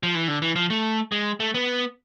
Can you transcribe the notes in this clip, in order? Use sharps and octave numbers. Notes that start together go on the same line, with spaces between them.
F3
E3
D3
E3
F3
A3
G#3
A3
B3